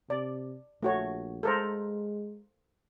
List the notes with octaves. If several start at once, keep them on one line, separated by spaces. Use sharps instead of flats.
C3 D5
A#1 A3 F#4 C#5
G#3 A4 A#4 C5